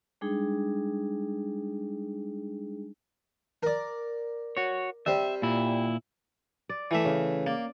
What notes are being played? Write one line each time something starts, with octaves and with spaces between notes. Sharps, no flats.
G3 G#3 D4 D#4 G#4
A#4 D5
F#4 C#5
G3 C4 E5
A#2 E4
D5
E3 A3 E5
C#3
A#3 D5